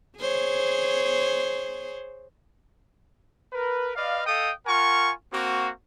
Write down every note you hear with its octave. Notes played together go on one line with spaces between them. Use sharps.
G#4 C5 C#5
A#4 B4
B4 D5 D#5 F5
A4 D#5 F5 G5 D#6
F4 A#4 F#5 G#5 C#6
A#3 C4 F#4